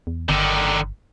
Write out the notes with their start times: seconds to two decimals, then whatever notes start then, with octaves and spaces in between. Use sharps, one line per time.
0.07 E2
0.29 G1 D3 D#3